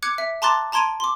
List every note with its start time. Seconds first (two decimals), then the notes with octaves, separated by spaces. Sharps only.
0.03 D6 F#6 G#6 C#7
0.18 E5
0.42 A5 A#5 C6 D6 F#6 A6
0.72 A5 A#5 C6 G#6 D7 D#7
1.00 C6 D6